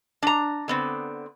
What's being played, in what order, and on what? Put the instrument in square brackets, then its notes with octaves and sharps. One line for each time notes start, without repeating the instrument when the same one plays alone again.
[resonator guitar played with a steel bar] D4 A#5
D3 B3 C4